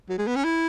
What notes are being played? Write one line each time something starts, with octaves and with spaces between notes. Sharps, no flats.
F#3
G#3
B3
C#4
E4